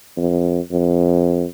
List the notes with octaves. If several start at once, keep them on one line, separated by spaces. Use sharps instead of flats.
F2
F2